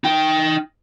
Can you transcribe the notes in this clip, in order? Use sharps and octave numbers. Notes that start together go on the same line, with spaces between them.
D#4 G5